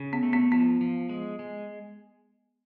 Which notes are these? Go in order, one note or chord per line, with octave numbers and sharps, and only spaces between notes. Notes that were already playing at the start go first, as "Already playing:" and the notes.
Already playing: C#3
B3
A3
B3
F3 B3
F3
G#3
G#3